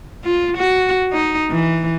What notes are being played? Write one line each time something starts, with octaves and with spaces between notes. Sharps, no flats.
F4
F#4
D#4
E3